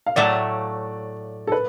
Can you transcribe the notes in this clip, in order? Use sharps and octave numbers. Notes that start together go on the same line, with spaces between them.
F5
A2 F#3 A3 D5
A4
B4